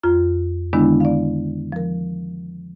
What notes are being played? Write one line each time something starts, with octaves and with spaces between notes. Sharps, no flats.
F2 F4 A#5
D3 D#3 G#3 B3 D4 E4
D5 F5
F3 A#4